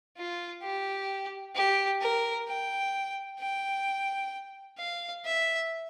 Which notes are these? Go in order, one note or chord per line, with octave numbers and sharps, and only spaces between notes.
F4
G4
G4
A#4
G5
G5
F5
E5